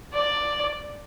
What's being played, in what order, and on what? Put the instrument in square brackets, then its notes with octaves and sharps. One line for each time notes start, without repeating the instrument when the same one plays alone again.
[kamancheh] D5